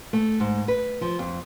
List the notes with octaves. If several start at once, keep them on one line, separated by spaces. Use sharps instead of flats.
A3
G#2
B4
F3
F2